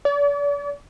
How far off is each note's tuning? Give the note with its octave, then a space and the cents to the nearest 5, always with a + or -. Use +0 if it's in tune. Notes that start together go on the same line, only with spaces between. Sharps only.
D5 -40